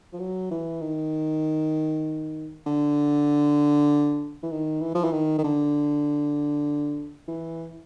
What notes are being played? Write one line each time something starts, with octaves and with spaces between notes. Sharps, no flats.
F3
F#3
E3
D#3
D3
E3
D#3
E3
F3
E3
D#3
D#3
D3
E3